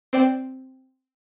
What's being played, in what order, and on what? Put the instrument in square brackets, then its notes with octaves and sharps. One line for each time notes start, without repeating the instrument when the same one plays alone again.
[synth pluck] C4 C5 D5 G5 D7